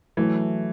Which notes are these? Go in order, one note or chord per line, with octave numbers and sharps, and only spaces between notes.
E3 F#3 A3